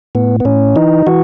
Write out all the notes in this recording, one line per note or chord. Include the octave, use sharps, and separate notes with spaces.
A2 B3
B3
A2 C#4
E3 D#4
E3 F#4